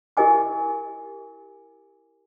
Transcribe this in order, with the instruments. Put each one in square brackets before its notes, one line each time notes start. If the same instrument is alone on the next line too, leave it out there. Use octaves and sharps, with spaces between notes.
[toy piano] E4 G4 A#4 D#5 G#5 D6